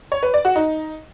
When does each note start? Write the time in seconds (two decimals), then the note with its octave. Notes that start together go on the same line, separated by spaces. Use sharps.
0.12 C#5
0.23 B4
0.34 D5
0.45 F#4
0.56 D#4